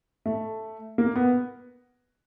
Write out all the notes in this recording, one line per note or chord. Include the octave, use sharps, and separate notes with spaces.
A3
A#3
B3